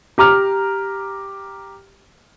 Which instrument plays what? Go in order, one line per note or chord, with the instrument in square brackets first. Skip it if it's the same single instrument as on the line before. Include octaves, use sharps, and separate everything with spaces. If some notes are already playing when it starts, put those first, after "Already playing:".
[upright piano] G4 A#5 D6 F6